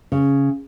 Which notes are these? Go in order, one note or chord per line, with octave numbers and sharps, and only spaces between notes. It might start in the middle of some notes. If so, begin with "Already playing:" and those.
C#3